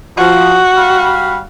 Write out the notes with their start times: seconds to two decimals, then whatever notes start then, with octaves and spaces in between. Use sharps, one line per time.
0.17 F3 F#4
0.74 G3 F5 B5